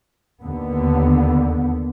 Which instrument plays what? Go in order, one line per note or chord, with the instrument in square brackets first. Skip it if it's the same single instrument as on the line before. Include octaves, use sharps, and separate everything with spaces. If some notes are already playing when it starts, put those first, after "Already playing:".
[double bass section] D#2 D3 B3